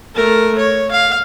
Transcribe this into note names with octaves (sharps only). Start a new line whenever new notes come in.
A3 A#4
C#5
F5